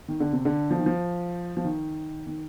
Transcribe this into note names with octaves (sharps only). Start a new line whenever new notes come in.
D#3
D3
C3
D3
F3
D#3
F3
F3
D#3
D#3